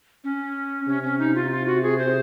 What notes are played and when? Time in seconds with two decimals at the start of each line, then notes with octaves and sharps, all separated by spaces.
0.24 C#4
0.87 C3 C#4
1.03 C#4
1.19 D#4
1.35 F4
1.51 F4
1.67 F#4
1.83 G#4
1.99 C5